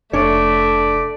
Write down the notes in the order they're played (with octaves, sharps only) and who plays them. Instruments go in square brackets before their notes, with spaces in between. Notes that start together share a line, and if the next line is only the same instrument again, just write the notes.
[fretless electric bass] F1 [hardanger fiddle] A3 [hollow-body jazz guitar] D4 C#5 [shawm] D5